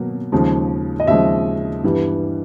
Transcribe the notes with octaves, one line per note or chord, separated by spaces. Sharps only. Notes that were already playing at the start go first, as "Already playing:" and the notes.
Already playing: B2 F#3 A#3
D#2 C#3 F3 G#3
D#5
D#2 C#3 F3 G#3 E5
G2 E3 G3 B3